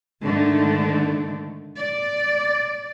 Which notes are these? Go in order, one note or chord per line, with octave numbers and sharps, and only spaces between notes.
G#2 D3 D#3 A3
D5